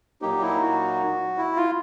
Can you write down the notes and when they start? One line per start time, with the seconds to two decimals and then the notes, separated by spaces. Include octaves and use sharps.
0.22 A#2 F#3 A#3 D#4 G4
0.41 E4
0.61 F#4
1.38 E4
1.56 F4